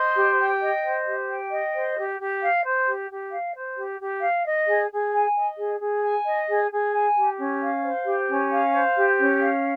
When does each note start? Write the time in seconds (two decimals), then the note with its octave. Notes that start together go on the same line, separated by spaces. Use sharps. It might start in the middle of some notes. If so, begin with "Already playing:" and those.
Already playing: C5 D#5
0.16 G4
0.39 G5
0.61 D#5
0.83 C5
1.06 G4
1.29 G5
1.51 D#5
1.74 C5
1.97 G4
2.20 G4
2.42 F5
2.64 C5
2.87 G4
3.10 G4
3.32 F5
3.55 C5
3.76 G4
3.99 G4
4.22 F5
4.45 D#5
4.67 G#4
4.90 G#4
5.12 G#5
5.35 D#5
5.57 G#4
5.80 G#4
6.02 G#5
6.26 D#5
6.48 G#4
6.70 G#4
6.93 G#5
7.15 G4
7.37 C#4
7.60 F5
7.83 C5
8.06 G4
8.29 C#4
8.51 F5
8.73 C5
8.96 G4
9.18 C#4
9.40 F5